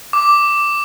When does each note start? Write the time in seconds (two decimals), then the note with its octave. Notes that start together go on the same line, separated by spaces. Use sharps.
0.13 D6